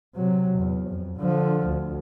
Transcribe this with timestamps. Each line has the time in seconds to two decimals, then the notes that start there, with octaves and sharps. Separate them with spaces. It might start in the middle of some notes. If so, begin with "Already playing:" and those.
0.15 C3 F#3
0.58 E2
0.89 F2
1.19 D3 F3
1.66 D2